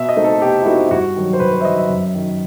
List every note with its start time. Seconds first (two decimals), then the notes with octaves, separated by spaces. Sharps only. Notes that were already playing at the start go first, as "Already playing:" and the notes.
Already playing: B2 E5
0.09 D#5
0.16 A3 C4 D#4
0.24 A4
0.41 B2 G4
0.61 E4
0.66 A3 C4 D#4 F#4
0.86 E4
0.91 G2 F#4
1.16 D#3 F#3
1.33 C5
1.40 G2 B4
1.53 C5
1.61 E5
1.65 D#3 F#3 D#5
1.78 E5
1.90 F#2
2.14 D#3 F#3